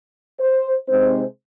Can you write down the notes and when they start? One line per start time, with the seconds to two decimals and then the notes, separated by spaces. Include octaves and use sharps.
0.38 C5
0.87 C3 G#3 C4 D#4 C5